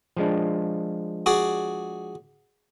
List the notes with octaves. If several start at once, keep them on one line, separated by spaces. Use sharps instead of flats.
F3 G#3 D4
F#4 G#4 D5